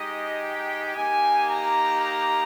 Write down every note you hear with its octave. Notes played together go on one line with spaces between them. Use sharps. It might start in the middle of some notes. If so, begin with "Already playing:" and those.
Already playing: G#3 D#4 G4 D#5
G5
A#3 D#4 G4 G#5
A#5
A#5